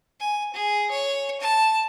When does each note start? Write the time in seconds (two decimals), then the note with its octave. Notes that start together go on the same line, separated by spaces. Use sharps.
0.20 G#5
0.54 G#4
0.91 C#5
1.41 A5